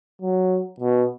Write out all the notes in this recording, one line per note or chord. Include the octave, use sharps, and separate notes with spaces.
F#3
B2